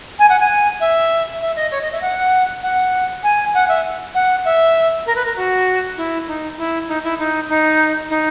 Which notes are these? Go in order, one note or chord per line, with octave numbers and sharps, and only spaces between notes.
G#5
F#5
G#5
E5
E5
D#5
C#5
D#5
E5
F#5
F#5
G#5
F#5
E5
F#5
E5
A#4
B4
A#4
F#4
E4
D#4
E4
D#4
E4
D#4
D#4
D#4